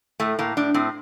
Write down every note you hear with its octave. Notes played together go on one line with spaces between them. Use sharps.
A2 A3
A2 A#3
A2 D4
A2 C4